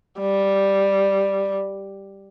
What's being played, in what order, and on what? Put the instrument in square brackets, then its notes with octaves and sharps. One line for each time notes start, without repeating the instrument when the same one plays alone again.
[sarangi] G3